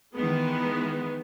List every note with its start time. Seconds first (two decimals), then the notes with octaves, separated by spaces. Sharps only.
0.15 D#3 E3 G#3 B3